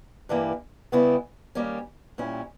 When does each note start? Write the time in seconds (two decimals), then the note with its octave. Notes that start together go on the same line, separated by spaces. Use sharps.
0.29 G2 E3 G3 A#3 E4
0.92 C#3 G3 B3 E4
1.55 D#3 G3 A#3 C#4
2.18 A#2 G3 C#4 E4